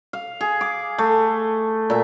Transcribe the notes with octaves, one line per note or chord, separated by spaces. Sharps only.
F5
G#4
D6
A3
A#2 E5